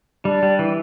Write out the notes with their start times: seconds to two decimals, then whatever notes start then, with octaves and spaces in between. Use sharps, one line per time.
0.25 G3 D4
0.43 G3
0.59 E3